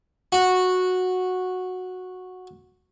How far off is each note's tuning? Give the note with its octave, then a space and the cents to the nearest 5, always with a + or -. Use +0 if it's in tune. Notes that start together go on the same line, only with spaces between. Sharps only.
F#4 -10